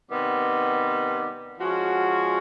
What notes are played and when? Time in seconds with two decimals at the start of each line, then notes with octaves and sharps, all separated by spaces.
0.11 C3 D#3 G3 B3
1.59 F3 G#3 C#4 F#4